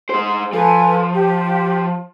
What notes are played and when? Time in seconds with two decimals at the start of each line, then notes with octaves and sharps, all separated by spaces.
0.10 G#3 C5
0.53 F3 A4 B4 G#5
1.13 G4